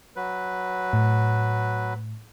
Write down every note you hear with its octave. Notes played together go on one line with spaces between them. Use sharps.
F#3 B4
A2